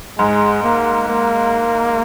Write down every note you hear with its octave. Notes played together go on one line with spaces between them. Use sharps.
G#2 G#3
A#3
A#3